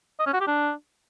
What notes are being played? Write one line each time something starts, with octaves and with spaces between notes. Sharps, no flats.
D#5
C#4
F#4
G4
D4